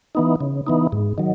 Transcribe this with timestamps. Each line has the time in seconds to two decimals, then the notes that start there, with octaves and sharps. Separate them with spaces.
0.15 E3 B3 D#4
0.41 C#3
0.67 E3 B3 D#4
0.92 G#2
1.18 D#3 F#3